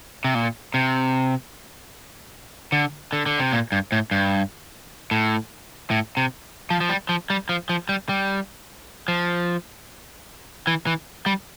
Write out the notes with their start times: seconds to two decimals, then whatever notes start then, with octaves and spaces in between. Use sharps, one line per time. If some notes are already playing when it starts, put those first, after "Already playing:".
0.24 C3
0.35 A#2
0.74 C3
2.72 D3
3.13 D3
3.26 D3
3.40 C3
3.53 A#2
3.72 G2
3.92 A2
4.11 G2
5.11 A2
5.91 A2
6.17 C3
6.70 F3
6.80 F3
6.89 G3
7.09 F3
7.30 G3
7.49 F3
7.69 F3
7.89 G3
8.09 G3
9.08 F3
10.67 E3
10.87 E3
11.26 G3